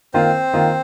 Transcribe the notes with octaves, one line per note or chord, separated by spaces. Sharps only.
D#3 A#3 C4 F4 C5
D#3 A#3 F4